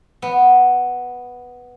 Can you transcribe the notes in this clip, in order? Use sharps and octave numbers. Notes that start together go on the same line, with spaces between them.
B3